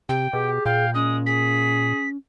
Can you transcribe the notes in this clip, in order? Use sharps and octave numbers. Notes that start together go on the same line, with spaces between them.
C3 G4 G5
B2 G4 G#4
A#2 F5 G5
G#3 C#4 D#6
G#4 B6